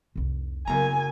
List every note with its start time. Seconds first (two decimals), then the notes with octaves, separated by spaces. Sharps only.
0.16 F1 C2
0.67 F#1 B3 G#5 A#5